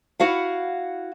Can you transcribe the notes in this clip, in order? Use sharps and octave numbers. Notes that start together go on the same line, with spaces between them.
E4 F#4 F5 F#5